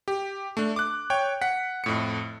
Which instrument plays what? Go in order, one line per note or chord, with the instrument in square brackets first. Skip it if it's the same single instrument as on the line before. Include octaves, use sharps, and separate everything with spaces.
[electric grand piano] G4
A3 D4
D6 F#6
C#5 G5
F#5 B6
F2 A2 C#7